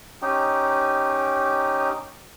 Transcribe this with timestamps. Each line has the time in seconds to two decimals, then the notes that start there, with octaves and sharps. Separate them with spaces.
0.22 C#4 D#4 G4